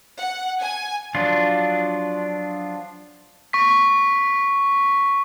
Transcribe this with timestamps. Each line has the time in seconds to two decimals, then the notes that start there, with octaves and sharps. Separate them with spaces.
0.20 F#5
0.61 G#5
1.15 F3 F#3 D4 F4
3.53 C#6 B6